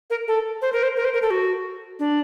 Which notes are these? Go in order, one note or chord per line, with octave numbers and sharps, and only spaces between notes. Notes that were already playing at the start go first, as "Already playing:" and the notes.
A#4
A4
C5
A#4
C5
A#4
C5
A#4
A4
F#4
D4